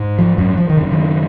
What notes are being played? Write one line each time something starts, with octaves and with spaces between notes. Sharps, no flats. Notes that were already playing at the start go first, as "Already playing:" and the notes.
Already playing: G#2
F3
F#2 F#3
F3
D#3
F#2 C#3
D#3